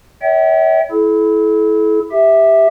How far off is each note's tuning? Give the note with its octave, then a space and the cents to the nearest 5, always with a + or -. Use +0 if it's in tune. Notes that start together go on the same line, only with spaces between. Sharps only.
C#5 +30 E5 -30 G5 -35
E4 +0 A4 -40
G4 +15 E5 -10